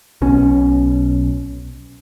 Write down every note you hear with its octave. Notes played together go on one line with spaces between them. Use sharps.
B1 B2 C#4